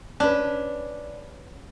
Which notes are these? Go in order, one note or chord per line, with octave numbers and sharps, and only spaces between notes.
C#4 D4 B4